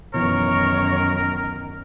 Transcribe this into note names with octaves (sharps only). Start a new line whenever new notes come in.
F#2 B2 D#3 E3 A#4 C#5